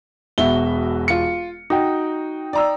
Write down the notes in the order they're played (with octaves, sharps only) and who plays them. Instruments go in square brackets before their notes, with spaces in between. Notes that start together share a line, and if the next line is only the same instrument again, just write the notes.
[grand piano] E1 F#4 [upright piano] B2 E5 G7
[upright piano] F4 C#7
[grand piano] D#4 G5 [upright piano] F#4
[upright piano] D5 A#5 E6